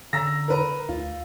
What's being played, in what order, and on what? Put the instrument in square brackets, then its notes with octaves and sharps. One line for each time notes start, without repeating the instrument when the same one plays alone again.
[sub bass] D3 [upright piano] A#5 E6 A#6
[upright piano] A#4 B4 A#5
[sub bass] D2 [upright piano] F4